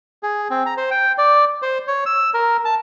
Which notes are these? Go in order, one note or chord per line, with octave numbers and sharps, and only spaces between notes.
G#4
C4
A#5
C5
G5
D5
C5
C#5
E6
A#4
A5